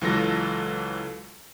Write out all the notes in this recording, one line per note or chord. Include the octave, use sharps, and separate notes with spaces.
C#2 E3 F#3 F4 A4 A#6